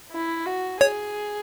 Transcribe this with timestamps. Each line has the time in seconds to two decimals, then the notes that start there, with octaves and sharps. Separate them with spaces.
0.12 E4
0.46 F#4
0.81 G#4 C#5